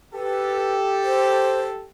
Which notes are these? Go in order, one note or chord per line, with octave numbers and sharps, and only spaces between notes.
G4 A4 B4
C5